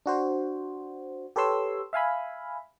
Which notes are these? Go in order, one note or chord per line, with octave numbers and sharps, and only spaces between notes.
D4 F#4 C5
G4 A4 B4 C#5 C6 E6
E5 F5 G#5 B5